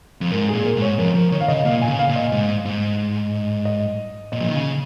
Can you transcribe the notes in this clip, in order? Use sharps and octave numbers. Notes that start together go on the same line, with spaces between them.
F2
G#2 A#4
A#2 G#4
A#4
G#2
C#5
F2 A#4
F3 A#4
D#3 C#5
F5
C#3 D#5
A#2 F5
A#2 G#5
C#3
F5
A#2
D#5
G#2
G#2
D#5
A#2 D#5
F3
D#3
C#3